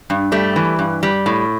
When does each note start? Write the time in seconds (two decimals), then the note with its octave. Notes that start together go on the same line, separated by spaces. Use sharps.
0.10 G2
0.32 G3 A3
0.56 E3
0.79 G2
1.03 G3
1.26 A2